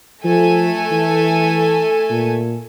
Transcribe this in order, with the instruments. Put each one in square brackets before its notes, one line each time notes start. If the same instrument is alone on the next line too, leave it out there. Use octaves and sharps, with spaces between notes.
[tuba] F3 [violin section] A3 A4 G#5
[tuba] E3
A#2